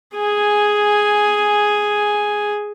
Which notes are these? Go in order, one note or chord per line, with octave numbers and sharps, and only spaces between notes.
G#4 G#5